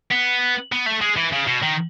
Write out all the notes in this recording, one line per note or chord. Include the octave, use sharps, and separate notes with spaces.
B3
B3
A3
G#3
E3
C#3
B2
D#3